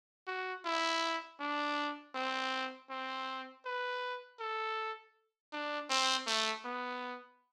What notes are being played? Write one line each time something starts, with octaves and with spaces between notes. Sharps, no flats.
F#4
E4
D4
C4
C4
B4
A4
D4
C4
A3
B3